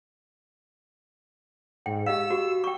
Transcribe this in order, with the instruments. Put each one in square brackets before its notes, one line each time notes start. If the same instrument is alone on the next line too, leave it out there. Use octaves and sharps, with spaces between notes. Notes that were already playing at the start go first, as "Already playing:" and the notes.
[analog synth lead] G#2 [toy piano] G5
[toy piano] G4 D#5 F5 [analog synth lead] E6
[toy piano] F#4 G4
G5 C#6